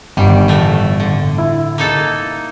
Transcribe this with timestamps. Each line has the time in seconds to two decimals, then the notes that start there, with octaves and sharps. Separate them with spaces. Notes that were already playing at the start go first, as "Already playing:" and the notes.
0.17 G1 D#3 G3
0.48 A2 E3 A3
1.00 D3
1.38 E4
1.78 A#3 D#4 A4